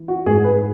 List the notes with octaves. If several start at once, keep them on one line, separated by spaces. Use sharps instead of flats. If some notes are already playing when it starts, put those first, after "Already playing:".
Already playing: E3
F#4
G#2 G#4
B4